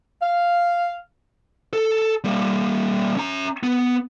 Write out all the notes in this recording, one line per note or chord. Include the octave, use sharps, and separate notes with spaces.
F5
A4
G3 A#3
C#4 A#5
B3